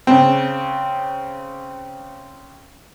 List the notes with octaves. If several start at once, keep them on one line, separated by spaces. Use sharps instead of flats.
C#3 C4